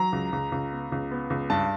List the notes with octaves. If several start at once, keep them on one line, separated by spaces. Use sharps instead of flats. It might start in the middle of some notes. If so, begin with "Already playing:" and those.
Already playing: F#3 A#5
C#2
C#2
C#2
B3
C#2
B3
C#2
G2 A5